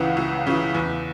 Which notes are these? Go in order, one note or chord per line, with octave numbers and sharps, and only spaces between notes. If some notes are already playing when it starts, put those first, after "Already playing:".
Already playing: C#2 C#3 E3 F#5
C#2
C#3 E3
E2